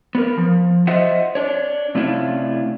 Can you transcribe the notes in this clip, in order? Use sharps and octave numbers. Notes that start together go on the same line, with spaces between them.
B3 A#4
F3
F4 C5 D#5 E5 F#5
D4 C#5
C3 A3 C#4 D4 E4 F4